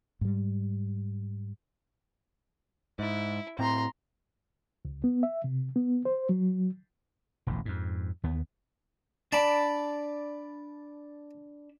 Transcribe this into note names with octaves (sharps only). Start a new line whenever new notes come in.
G#2 G3
G#2 E4
A2 C4 A#5 C6
C#2
B3
E5
C3
B3
C5
F#3
E1 A1 D2 G#2
F2 G#2
D#2 B3
D4 D5 A5 B5